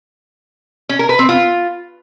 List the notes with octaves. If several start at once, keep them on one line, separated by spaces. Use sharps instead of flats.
C#4
A#4
B4
C4
F4